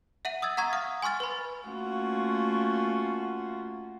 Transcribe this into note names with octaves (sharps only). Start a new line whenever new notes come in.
E5 F#5 D#7 F#7
D#6 E6 G#6 A6
F#5 A#5 C#6 G#6
F5 D#6 F6
G#5 C6 C#6 F6 A6
B4 B5
A3 A#3 C#4 F4 F#4